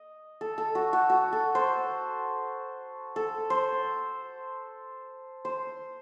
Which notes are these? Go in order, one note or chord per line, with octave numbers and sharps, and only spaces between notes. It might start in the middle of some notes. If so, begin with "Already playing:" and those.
Already playing: D#5
A4
A4
F#4
F#4
F#4
A4
C5
A4
C5
C5